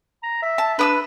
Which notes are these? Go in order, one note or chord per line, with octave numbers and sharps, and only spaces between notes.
A#5
E5
A5
D4 B4 D#6 E6